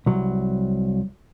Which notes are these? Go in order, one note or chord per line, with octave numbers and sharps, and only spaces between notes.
C2 F#3